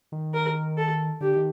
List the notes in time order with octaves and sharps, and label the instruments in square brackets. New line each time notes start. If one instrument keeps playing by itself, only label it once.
[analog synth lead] D#3
[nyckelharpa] A#4
A4
[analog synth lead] D3 [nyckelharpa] G4
[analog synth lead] D#3